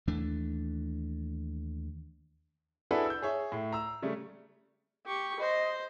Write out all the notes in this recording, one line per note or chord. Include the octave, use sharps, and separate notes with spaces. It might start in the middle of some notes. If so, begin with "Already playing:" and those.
D#2 E3 A3 D4
D4 E4 F#4 G#4 A4 B4
E6 G6
G#4 C#5 E5
A2
A#5 E6
C#3 G3 A3
G4 C#6
C5 D#5